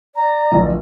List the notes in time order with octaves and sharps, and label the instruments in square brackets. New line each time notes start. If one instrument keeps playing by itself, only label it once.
[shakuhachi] D5 [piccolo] A#5
[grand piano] D1 A#1 D#5